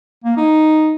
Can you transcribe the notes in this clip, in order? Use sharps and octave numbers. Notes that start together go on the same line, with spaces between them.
A#3
D#4